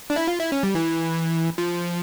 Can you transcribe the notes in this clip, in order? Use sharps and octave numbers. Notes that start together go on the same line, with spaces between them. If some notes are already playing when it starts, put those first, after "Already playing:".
D4
E4
F4
E4
C#4
G3
E3
F3